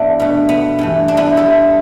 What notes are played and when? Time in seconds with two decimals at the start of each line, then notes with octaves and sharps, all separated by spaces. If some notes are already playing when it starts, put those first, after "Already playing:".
Already playing: G2 E3 B3 D4 E4
0.19 B2 A3
0.49 B3
0.79 G2 E3 A3
1.08 D4
1.17 B3 E4
1.36 G2 G3 E4 A4